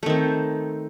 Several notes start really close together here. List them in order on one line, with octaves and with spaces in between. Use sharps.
A3 D#3 C4